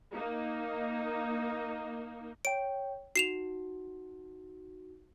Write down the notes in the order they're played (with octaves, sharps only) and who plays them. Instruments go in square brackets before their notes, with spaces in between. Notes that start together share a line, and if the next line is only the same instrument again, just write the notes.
[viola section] A#3 D#4
[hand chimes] C#5 G5 [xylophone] D7
[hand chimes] D#4 F#4 [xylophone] C7 E7 F7